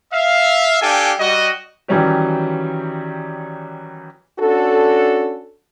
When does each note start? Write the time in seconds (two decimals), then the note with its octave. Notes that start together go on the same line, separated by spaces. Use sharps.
0.14 E5 F5
0.81 D4 G4 A4 F5 G5 G#5
1.20 G3 F#4 D#5
1.88 D#3 E3 F#3 G3 C#4 G4
4.40 C#4 D4 F#4 A4